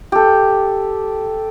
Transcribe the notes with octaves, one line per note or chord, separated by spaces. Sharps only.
G4 A4